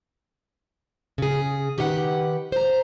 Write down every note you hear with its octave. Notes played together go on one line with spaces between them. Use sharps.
C#3 G#4
D#3 G4 B4 F5 F#5
C5 A#5